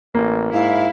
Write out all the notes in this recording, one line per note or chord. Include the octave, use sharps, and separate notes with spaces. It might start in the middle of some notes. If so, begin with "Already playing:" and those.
A1 A#3
G#2 E4 F5